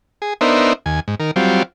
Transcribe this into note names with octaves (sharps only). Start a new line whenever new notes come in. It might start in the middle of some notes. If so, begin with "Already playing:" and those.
G#4
B3 D4 D#4 A#4 C5 E5
D#2 G#5
G#2
D#3 A#4
F#3 G3 C4 F4